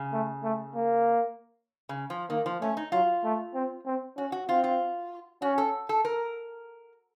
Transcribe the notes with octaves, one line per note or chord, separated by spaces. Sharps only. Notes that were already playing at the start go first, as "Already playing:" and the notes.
Already playing: C#3
A3
A3
A#3
C#3
F3
D#3 A#3
F3
A3 C#4
D#4
F#3 F4
A3
C4
C4
C#4 F#4
F#4
C4 F4
F4
C#4 F#4
A4
A4
A#4